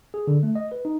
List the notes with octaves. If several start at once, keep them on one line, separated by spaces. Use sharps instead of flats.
G#4
D3
A3
D#5
B4
D#4